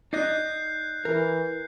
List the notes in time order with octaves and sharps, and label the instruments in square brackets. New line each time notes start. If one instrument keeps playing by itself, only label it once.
[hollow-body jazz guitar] D#4 D5 D#5 [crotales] F#6 G6 C7
[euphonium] E3 [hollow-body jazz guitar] A#4